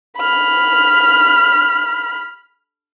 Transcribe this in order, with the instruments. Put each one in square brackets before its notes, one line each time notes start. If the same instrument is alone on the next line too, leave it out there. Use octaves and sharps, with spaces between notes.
[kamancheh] B5 F6